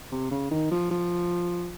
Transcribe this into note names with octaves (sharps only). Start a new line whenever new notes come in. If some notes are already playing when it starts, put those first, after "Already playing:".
C3
C#3
D#3
F3
F3